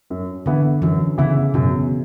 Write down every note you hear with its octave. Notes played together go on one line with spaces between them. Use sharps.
F#2
D3 E3 B3 E4
F#2 E3
C#3 E3 B3 E4
F#2 B2